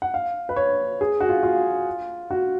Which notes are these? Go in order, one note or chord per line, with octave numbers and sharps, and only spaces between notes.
F#5
F5
B4
C#5
G#4
F#4
F4
F4
F#4